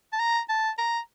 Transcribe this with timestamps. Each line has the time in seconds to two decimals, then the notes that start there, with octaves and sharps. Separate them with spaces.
0.13 A5
0.19 A#5
0.49 A5
0.78 A#5